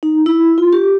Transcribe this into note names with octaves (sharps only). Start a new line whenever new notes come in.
D#4
E4
F4
G4